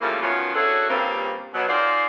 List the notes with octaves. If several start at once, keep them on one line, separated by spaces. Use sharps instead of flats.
C#3 E3 F3 G3 A3 A#3
D#3 F3 F#3 B3 C#4 F4
C#4 D4 E4 F#4 G#4 A4
G2 A#2 C#3 G3 A#3 C4
B2 F#3
D#4 F4 G#4 A#4 C5 D5